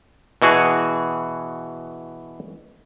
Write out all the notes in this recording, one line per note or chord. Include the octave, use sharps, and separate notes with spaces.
B2 E3 F#4 G#4